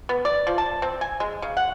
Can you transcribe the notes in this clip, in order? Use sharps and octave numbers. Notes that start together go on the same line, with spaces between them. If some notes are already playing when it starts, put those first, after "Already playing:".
B3
D5
F3
A5
C4
G#5
G#3
C#3
F#5